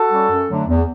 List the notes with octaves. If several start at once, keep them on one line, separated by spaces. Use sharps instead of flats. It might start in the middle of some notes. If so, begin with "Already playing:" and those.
Already playing: F#4 A4
G3 C#4
F#2
D3 F#3 A3 D4
E2